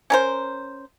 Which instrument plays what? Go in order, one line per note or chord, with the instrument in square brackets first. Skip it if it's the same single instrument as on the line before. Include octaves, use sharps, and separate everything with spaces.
[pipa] C#4 A#4 C5